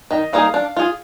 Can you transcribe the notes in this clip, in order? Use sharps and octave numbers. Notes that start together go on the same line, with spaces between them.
D#3 D#5
G3 A#3 D#4 G#4 F5
D4
F4 G#4